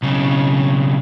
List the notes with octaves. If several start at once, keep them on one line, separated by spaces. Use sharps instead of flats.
B1 C#3